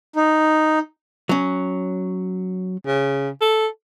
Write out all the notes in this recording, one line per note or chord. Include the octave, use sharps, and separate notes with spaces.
D#4
F#3 C#4
C#3
A4